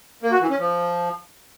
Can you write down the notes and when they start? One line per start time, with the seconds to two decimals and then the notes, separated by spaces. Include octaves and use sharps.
0.23 A#3
0.32 F#4
0.41 E3
0.50 C#4
0.59 F3